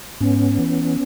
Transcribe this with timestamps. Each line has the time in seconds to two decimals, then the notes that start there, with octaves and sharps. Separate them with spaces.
0.21 G#2 B3 C#4
0.59 E3